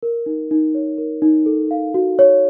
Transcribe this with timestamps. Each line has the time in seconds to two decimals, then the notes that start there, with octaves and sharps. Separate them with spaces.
0.03 A#4
0.26 D#4
0.51 D#4
0.75 C#5
0.98 A#4
1.22 D#4
1.46 A4
1.71 F5
1.94 F#4
2.19 C#5